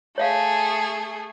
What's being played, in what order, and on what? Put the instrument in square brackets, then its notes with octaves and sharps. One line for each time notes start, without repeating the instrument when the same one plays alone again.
[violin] A3 G#4 [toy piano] C#5 E5 F5